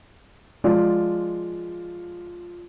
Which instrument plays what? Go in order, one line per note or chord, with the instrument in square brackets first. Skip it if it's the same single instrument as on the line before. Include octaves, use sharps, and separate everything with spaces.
[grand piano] F3 G#3 F4 D5